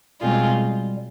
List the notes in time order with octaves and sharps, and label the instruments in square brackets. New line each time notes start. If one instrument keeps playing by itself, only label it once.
[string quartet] B2 G#3 C4 F4 G#4 [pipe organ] G3